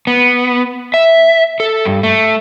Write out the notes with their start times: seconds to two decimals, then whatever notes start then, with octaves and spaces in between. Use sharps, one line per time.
0.07 B3
0.94 E5
1.60 A4
1.85 G2
2.03 A3